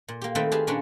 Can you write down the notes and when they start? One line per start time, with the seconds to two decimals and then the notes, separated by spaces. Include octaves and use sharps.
0.08 A#2
0.21 A#3 G4
0.35 D#3 A3 C4 B4 E5 G5
0.51 G4 G#4 B4 F5 A5
0.67 A#2 C#4 D4 F4 A#4 B4